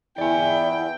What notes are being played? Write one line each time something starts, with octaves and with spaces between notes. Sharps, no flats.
E2 E4 D5 G5 G#5